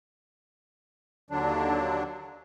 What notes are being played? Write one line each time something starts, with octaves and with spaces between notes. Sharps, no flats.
D#2 D3 F#3 D4